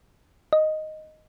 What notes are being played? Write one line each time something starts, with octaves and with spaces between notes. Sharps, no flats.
D#5